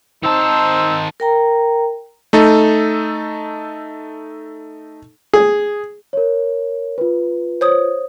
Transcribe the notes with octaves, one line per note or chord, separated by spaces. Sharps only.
D#3 C4 D#4 C5 A5 E6
A#4 G5 A#5
A3 D#4 A4
G#4
A#4 C#5
F4 B4
C5 C#5 D#6